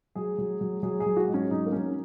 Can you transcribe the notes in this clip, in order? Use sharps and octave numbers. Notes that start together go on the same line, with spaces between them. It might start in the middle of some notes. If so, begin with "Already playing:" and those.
F#3 G#4
F#3
F#3
F#3 G#4
G#4
F#3
F#4
G#2
C#4
F#3 D#4
A#3
F#3 C#4